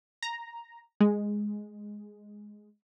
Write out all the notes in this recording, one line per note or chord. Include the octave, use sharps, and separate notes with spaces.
A#5
G#3